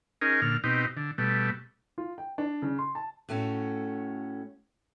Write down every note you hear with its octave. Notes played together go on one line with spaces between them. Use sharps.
C#4 D#4 G#4 A#4
A#2 D3 F6
B2 C4 D#4 G4
D3
B2 G3 A3
F4
G5
D4
C#3
C6
A5
A2 A3 C#4 F#4